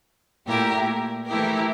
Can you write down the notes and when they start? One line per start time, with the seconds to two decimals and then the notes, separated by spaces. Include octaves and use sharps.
0.45 A#2 A3 E4 G4 A#4
1.26 E3 A3 E4 G4 A#4